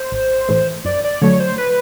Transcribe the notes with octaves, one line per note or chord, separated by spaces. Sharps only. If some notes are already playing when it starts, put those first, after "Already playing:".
Already playing: C5
A1
A2 E3 A3
F#2 D5
D5
D3 F#3 A3 C#5
C5
B4